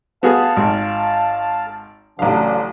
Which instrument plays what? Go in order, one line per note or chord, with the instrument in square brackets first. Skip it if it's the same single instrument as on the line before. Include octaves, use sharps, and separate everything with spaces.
[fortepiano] B3 F#4 G#4 [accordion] F5 A5
[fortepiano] G#1
[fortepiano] A1 F5 [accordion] C#3 F#3 D4